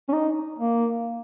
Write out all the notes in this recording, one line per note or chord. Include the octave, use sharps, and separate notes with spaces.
C#4
D#4
A#3